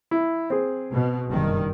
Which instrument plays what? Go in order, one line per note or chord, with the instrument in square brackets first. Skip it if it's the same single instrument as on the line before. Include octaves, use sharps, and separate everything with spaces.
[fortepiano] E4
C4 G#4
[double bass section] B2
F#1 G2 D#3